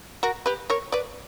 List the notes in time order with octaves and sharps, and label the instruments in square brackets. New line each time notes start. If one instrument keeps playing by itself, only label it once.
[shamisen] F#4 A#4
G4 B4
A#4 C#5
B4 D5